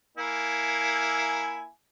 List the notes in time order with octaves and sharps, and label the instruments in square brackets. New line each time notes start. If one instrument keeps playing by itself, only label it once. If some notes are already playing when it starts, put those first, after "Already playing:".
[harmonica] A#3 E4 G#5